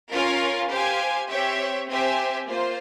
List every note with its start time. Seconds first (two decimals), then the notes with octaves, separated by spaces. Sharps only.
0.13 C#4 F4 A#4 C#5 F5
0.71 G4 C5 F5 G#5
1.30 C4 G4 C#5 E5
1.89 C4 G4 C5 E5 G#5
2.48 A#3 F4 C5